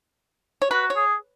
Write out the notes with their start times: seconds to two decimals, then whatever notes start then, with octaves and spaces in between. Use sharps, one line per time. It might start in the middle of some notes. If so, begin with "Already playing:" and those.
0.62 C#5
0.71 F#4 B4
0.90 C#5
0.96 G#4